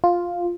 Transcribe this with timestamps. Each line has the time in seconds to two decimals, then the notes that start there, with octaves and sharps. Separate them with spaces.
0.04 F4